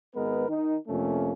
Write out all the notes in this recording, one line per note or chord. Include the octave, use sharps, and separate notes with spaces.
G#1 G#3 B3 A#4 B4
D#3 D#4
F2 C3 A3 A#3 C#4